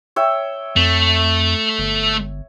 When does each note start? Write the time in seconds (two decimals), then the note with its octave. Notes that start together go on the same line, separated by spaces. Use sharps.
0.16 C#5 E5 G5
0.76 F2 A3
1.79 G1